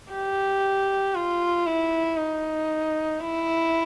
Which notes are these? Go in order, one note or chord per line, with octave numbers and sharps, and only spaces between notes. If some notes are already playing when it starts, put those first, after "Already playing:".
G4
F4
E4
D#4
E4